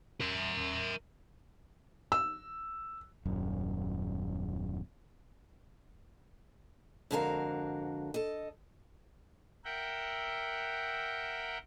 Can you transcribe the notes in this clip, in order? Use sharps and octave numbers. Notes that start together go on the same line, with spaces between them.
A#4 E5
E6
D#1 F#2
F2 G#2 D3 F#4 A#4 F5
A4 D#5
A#4 E5 F#5 G5